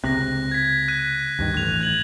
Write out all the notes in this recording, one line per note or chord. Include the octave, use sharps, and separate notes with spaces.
C#2 C3 F#6 A#6
G#6 B6
F#6 B6 D#7
D2 G2 D#3
A1 F#6 F7
G#6 F7 F#7